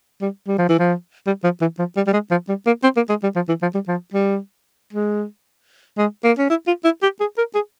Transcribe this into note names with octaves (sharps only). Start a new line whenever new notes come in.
G3
G3
F3
E3
F3
G3
F3
E3
F3
G3
G3
G#3
F3
G3
A#3
C4
A#3
G#3
G3
F3
E3
F3
G3
F3
G3
G#3
G#3
A#3
C#4
E4
F4
E4
G4
G#4
A#4
G#4